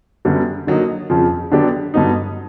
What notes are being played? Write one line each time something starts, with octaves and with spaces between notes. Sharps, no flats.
F#2 D3 G3 B3
D3 F#3 A#3 D#4
F2 C#3 F3
D3 F#3 B3 D4 G4
G2 D3 F#3 B3 D#4